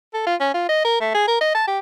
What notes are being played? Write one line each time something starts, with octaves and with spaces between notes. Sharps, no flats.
A4
F4
C#4
F4
D#5
A#4
A3
G#4
A#4
D#5
A5
G4